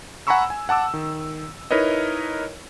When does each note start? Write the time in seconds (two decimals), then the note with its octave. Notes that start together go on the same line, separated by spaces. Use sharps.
0.27 F#5 G#5 A#5 B5 C#6 E6
0.50 G#5
0.69 F#5 A5 D6 E6
0.94 D#3
1.71 D#4 E4 A#4 B4 C#5 D#5